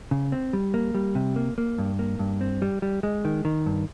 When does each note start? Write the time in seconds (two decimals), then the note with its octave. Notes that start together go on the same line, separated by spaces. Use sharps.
0.11 C#3
0.32 C4
0.53 G3
0.74 A#3
0.95 G3
1.15 C3
1.36 A#3
1.58 A#3
1.78 G2
1.99 A#3
2.19 G2
2.41 C4
2.62 G3
2.82 G3
3.03 G#3
3.25 D#3
3.45 D#3
3.66 G2